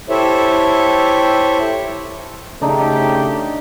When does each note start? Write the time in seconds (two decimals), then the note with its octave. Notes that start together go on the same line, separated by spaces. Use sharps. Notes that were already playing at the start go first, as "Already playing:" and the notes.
0.10 E4 G4 A4 C5 C#5 E5
2.61 C#3 A3 D4 D#4 G4